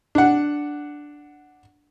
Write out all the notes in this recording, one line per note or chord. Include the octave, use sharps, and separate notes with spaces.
D4 F#5